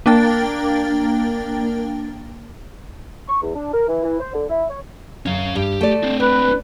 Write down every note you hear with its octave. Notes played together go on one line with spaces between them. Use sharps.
A#3 D4 A#4 G5 A6
C#6
E2
D4
A#4
E3
E3
C5
D3
E4
C#5
F#2 C#4 F5
G2 G4
A3 D5
C4 D4
B4 D5